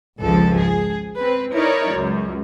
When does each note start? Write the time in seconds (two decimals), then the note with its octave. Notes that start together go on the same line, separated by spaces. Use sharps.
0.19 G#1 C#2 F3 A4
0.59 G#4
1.19 C4 B4
1.52 D#4 E4 A#4 C#5 D5
1.92 C#2 F#2